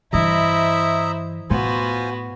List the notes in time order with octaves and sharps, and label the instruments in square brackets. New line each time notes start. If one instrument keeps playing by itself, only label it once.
[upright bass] G2 E3 [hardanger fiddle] E4 C5 [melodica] D#5 E5 A#5
[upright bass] A2 [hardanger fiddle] B3 F#4 [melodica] F4 C5 G#5